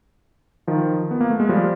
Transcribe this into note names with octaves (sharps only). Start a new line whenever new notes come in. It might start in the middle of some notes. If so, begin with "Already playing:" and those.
D#3 F3
B3
A#3
A3
G#3
F3 G3